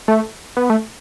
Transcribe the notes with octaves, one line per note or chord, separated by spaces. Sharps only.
A3
B3
A3